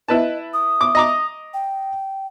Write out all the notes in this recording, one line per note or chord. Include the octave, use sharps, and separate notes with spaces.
E4 B4 D#5 A5
D#6
D6
D#5 A#5 D6
G5